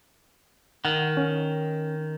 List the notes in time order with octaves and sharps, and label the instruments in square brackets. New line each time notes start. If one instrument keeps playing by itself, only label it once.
[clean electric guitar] D#3 [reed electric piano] F#5
[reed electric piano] C#4